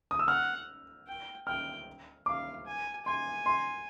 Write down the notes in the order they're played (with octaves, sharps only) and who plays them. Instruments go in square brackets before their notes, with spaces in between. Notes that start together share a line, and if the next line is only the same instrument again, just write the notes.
[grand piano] D#6
E6
[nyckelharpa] F#5 [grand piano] F6
[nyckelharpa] G5
[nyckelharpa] G5 [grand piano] F6
[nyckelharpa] F5 [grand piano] D6
[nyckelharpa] G#5
[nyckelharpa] G#5 [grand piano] C6
[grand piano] C6